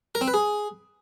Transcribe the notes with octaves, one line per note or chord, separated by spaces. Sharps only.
A#4
C4
B4
G#4